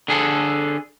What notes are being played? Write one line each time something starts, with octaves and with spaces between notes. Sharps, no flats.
D3 G#4 A4